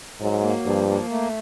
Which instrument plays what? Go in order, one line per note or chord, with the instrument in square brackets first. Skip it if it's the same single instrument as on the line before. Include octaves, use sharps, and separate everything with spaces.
[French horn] G#2 [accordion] F#3
[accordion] A#3
[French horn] G2 [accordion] F3
[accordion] A#3
A3